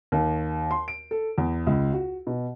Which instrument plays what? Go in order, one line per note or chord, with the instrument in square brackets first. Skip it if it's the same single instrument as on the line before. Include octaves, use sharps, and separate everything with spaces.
[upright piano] D#2
C6
D7
A4
E2
C#2
F#4
B2